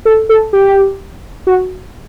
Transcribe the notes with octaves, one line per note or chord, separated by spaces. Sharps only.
A4
A4
G4
F#4